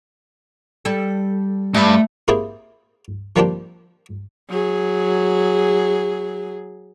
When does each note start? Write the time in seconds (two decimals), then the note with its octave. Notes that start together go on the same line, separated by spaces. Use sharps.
0.85 G3 A4
1.74 G2 A3
2.28 A#3 C4 E4 G4 G#4
3.36 F3 G3 A#3 C4 D4 G4
4.50 F#3 G#4